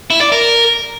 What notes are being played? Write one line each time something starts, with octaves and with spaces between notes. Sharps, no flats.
E4
D5
A#4